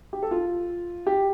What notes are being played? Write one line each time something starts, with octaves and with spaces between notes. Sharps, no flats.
G4
A4
F4
G4